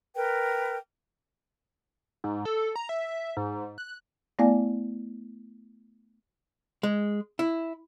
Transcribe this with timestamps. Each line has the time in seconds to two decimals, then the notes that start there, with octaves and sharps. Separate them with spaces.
0.16 A#4 B4 G5
2.24 G#2
2.45 A4
2.76 A#5
2.89 E5
3.37 G#2
3.78 F#6
4.39 A3 B3 E4 D5 F5 G#5
6.83 G#3
7.39 E4